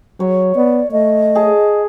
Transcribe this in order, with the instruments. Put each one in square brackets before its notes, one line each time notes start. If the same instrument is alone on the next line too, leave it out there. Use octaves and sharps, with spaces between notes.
[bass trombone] F#3 [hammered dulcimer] C#5
[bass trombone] B3 [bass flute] D5
[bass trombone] A3 [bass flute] D#5
[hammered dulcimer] G#4 A5